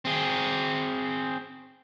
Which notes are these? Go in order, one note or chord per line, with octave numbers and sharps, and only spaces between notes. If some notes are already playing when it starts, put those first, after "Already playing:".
C4 G#4